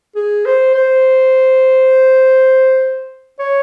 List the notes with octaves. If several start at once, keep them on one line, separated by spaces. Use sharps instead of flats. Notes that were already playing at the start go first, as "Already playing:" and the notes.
G#4
C5
C5
C#5